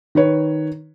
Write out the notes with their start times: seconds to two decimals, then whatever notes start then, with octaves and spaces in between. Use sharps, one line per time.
0.15 D#3 B4 C#5